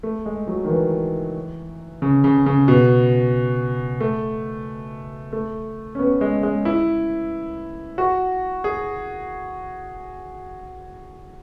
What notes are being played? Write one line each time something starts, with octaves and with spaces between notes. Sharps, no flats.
A3
G#3
F#3
D#3
E3
C#3
C#3
C#3
B2
A3
A3
C#4
B3
G#3
G#3
E4
F#4
G#4